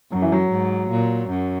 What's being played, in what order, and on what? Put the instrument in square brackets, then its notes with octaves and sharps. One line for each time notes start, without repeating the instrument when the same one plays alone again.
[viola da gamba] F#2 [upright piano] F#3
[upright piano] E3
F#3
[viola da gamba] G#2
A#2
F#2